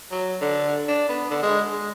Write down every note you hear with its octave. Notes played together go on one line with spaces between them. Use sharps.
F#3
D3
D4
B3
D3
G#3
G#3